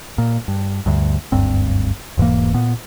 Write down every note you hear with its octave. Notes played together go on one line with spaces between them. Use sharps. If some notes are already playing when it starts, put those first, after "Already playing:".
A#2
G2
D2 G2
F#1 D2 G2 C4
E1 G#2 E3 A#3
A#2 B3